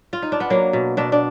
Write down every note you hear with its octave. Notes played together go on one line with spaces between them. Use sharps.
F4
D#4
D4
B3
F#3 A#3
B2
B2 D4
D4